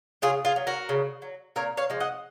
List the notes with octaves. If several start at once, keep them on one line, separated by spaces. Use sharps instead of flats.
C#3 F4 G#4
F4 G#4
F#3
F#4 A#4
C#3
F#3
A#2 A#4 C#5
C#5 F5
F3 G#3
D#5 F#5